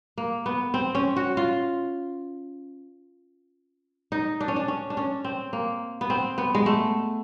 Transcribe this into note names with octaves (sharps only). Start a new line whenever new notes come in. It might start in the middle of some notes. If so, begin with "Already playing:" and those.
A#3
B3
C4
C#4
F#4
F4
D#4
D4
C#4
D4
C#4
D4
C#4
C4
A#3
B3
C4
B3
G#3
A3